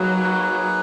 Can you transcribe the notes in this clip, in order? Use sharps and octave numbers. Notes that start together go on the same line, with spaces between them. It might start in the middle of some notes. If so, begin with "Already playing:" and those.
Already playing: F#3 A#3 D#4 G#4 B4